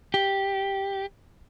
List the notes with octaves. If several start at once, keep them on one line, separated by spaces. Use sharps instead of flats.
G4